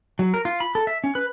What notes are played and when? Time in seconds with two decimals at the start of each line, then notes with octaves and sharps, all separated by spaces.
0.19 F#3
0.34 A#4
0.45 F4
0.60 B5
0.75 A4
0.87 E5
1.04 C#4
1.15 B4